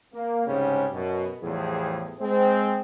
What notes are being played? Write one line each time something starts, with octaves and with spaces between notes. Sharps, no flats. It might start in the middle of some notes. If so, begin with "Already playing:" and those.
A#3
C2 G#2 C#3 G3 G#3 C#4
F#2 B2
E2 A2 F3 G3 G#4
G#3 C4